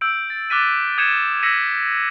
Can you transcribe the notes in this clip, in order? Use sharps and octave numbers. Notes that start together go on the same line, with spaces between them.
E6 G6 D7
A6
D6 F6 F#6 A6 B6 D#7
D#6 G6 G#6 C#7 D#7 E7
E6 G#6 A#6 B6 C#7 D#7